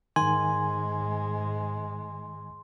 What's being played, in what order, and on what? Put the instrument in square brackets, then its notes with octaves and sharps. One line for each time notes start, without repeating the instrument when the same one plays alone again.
[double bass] G#2 G#3 [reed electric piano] D#3 G#5 [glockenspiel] C6